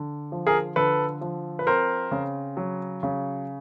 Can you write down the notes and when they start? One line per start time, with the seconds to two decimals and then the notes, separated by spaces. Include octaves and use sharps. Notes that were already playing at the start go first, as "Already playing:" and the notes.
Already playing: D3
0.32 F3
0.47 G#4 A#4
0.76 D3 A4 B4
1.21 F3
1.59 B4
1.67 C4 A#4 C5
2.11 C#3
2.57 F#3
3.03 C#3